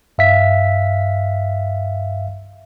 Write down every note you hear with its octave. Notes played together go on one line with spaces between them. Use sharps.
G2 E5 F5 B6